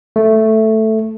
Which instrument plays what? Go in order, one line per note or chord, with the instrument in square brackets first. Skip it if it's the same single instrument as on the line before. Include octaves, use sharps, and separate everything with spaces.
[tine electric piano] A3